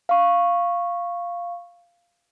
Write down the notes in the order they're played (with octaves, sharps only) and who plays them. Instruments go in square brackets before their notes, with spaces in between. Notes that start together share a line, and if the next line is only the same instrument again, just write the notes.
[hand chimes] F5 C#6